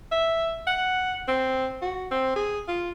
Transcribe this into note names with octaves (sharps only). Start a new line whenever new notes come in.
E5
F#5
C4
F#4
C4
G#4
F4